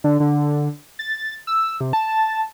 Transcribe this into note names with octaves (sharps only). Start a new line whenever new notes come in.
D3
D3
A6
E6
C3
A5